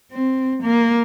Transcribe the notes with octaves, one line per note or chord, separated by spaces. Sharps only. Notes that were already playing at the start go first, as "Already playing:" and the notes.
C4
A#3